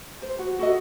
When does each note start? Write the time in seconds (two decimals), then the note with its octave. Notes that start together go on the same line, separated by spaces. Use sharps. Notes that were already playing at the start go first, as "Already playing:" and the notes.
0.22 C5
0.39 F#4
0.59 F#4 A4 D#5